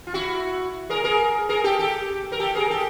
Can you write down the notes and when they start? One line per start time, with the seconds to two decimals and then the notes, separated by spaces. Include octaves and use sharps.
0.07 F4
0.14 E4 F#4
0.90 G#4 A#4
1.04 G#4 A#4
1.49 G#4 A#4
1.64 G4 A4
1.79 G4 A4
2.32 A#4
2.39 G4 A4
2.55 G#4 A#4
2.70 G4 A4